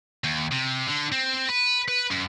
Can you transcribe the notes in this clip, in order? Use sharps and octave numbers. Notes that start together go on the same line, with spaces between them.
D#2
C3
D3
C4
B4
B4
F#2